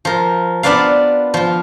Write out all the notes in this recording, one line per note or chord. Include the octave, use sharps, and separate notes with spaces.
F3 A#4
B3 D4 F4 B4 D5 F5
F3 F4